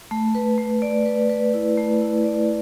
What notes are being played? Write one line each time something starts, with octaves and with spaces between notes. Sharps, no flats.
A3
B4
A3
D5
B4
B4
E4
A3
E4
D5